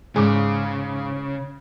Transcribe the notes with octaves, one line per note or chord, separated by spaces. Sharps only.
G#2 C#3 G#4 D6